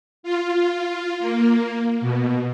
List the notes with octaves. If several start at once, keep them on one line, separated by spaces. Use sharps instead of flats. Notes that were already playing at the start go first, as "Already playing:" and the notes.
F4
A#3
B2